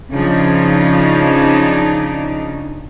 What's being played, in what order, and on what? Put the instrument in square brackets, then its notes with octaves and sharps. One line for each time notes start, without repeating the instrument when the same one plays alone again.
[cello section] C#3 F3 D4 D#4